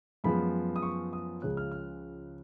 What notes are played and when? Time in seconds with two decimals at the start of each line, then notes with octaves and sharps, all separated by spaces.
0.24 F#2 F3 G#3 B3 B5
0.76 D#6
0.82 C#6
1.13 D#6
1.42 C#2 C#3 F3 G#3 C#4 F#6
1.57 F6
1.72 F6